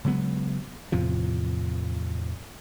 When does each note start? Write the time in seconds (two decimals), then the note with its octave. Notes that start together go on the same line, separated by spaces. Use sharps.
0.05 C#3 F#3 G#3 B3
0.92 E2 A2 C3 F3